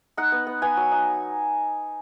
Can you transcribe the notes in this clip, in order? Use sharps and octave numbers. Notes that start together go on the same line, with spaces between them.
D#4 F#5
B3
B3
B3 G#5
F#3
D#4